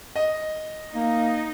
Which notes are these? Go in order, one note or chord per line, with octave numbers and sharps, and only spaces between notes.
D#5
A#3 D#4